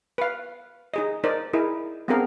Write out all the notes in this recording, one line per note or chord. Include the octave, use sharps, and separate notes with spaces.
B4 F5
D#4 G#4 D#5
D#4 A#4 C5 D5
D#4 E4 G#4 A#4
B3 C4 D4 G#4 A#4 F5